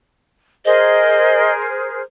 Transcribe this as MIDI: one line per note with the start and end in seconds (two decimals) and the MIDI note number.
0.65 2.02 68
0.65 2.02 70
0.65 2.02 72
0.65 1.51 75